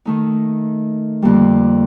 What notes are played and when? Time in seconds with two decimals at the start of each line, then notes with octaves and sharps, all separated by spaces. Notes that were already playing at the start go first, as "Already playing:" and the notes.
0.05 D#3 A3 D#4
1.22 F2 D3 G3 A#3